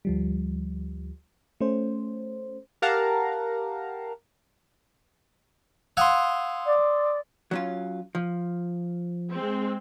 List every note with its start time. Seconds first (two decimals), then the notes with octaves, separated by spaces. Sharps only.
0.05 D2 F3 G3
1.61 A3 C#4 C5
2.82 G4 A#4 F5 F#5 A5 A#5
5.97 F5 F#5 G#5 C6 D#6 E6
6.66 D5
7.51 F#3 C#4 F4
8.15 F3
9.31 G#3 C4